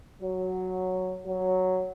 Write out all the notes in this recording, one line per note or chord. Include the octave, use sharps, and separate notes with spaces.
F#3
F#3